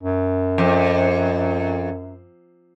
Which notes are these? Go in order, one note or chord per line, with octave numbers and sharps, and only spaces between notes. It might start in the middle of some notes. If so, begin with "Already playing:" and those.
F#2
F2